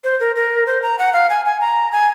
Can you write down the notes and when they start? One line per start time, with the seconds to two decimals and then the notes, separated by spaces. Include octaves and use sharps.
0.04 C5
0.20 A#4
0.36 A#4
0.67 C5
0.82 A#5
0.99 F#5
1.13 F5
1.30 G#5
1.46 G#5
1.61 A#5
1.92 G#5